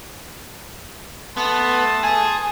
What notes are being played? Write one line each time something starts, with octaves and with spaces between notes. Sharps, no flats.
A3 B3 A5 C6
G#4